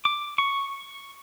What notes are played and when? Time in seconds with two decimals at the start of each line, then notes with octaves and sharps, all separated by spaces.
0.05 D6
0.38 C#6